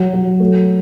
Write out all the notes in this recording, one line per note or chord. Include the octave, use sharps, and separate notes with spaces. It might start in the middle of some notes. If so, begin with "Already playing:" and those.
Already playing: F#3
F#3
A3